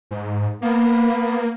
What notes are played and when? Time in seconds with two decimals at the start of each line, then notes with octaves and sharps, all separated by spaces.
0.11 G#2
0.62 A#3 B3